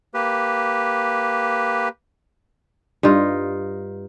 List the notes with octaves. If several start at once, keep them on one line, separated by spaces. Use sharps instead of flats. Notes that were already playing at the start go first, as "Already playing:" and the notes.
A#3 G4 B4
G2 D#4 F4